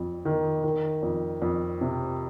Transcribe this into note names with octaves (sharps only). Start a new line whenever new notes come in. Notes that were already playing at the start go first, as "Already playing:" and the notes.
Already playing: F2
D#3
D#3
F2
F2
C3